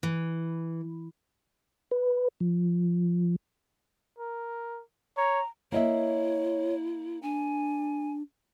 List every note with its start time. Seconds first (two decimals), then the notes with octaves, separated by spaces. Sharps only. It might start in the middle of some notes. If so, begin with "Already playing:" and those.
0.03 E3
1.91 B4
2.40 F3
4.19 A#4
5.17 C#5 A#5
5.72 A#3 E4 C#5 D#5 E5
7.23 D4 G#5